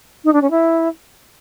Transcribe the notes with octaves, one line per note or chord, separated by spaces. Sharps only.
D#4
D4
C#4
E4